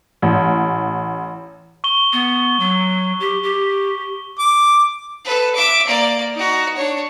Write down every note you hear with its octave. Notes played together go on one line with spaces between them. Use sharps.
A1
C#6 G7
B3
F#3
G4
G4
D6
A4 B4
E5 D6
A#3 D5
D#4 F#4
D4 C#5